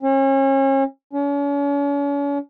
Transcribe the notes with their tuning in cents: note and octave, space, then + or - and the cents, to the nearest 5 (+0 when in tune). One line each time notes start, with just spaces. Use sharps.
C#4 -35
C#4 +40